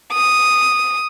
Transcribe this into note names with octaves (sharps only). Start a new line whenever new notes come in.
D#6